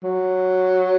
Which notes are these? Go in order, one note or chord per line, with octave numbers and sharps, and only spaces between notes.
F#3